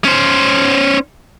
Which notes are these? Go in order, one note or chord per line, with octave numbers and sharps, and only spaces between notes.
C#4 C5